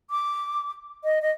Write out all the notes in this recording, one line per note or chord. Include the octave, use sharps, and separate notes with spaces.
D6
D#5
D#5